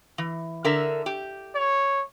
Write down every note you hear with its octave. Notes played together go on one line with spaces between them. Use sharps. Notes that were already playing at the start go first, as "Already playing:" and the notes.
E3
D3 A#4 E5
G4
C#5